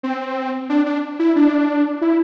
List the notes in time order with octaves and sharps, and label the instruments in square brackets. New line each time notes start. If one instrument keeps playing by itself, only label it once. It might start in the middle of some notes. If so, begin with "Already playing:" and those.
[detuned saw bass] C4
D4
D4
E4
D4
E4